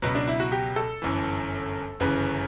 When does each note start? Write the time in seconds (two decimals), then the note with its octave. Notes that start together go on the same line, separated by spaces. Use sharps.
0.02 C#2 B2 F#3 B3
0.15 D4
0.28 E4
0.40 F#4
0.52 G4
0.76 A4
1.02 G1 F#2 E3
2.00 G1 F#2 C#3 E3 B4